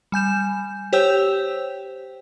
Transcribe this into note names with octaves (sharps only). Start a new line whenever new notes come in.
G3 G#5 G6 E7
G4 C5 C#5 G5 E6 G6